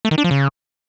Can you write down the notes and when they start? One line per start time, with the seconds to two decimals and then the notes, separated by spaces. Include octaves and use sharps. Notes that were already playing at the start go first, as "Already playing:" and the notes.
0.05 A3
0.11 D#3
0.18 D4
0.24 F3
0.31 C#3